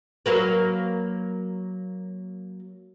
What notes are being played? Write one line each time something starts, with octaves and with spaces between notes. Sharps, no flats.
F#3 A#3 B4